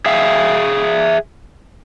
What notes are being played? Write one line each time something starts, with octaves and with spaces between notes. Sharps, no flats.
G#4 E5 F5